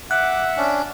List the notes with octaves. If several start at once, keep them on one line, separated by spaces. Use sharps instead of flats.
E5 F#5 D6 F#6
C#4 D4